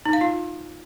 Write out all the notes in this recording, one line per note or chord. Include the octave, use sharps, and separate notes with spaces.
D#4
F5
F4